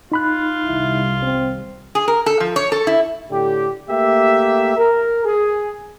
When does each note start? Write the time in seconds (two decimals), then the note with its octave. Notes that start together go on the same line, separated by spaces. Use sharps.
0.12 D#4 F4 B5 F#6
0.65 C2 D#3 G3 E4
1.23 C4
1.95 G#4
2.08 A#4
2.26 A4
2.40 F3
2.56 C#5
2.72 A4
2.87 E4
3.31 A2 D3 G4
3.89 A3 A#3 G4 E5
4.77 A#4
5.25 G#4